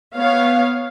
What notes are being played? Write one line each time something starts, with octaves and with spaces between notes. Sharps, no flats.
B3 C#5 F5